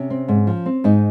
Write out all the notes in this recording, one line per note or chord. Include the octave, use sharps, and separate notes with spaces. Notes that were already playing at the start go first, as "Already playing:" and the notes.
Already playing: C3 C#4
C4
G#2
F3
C4
G#2 D#4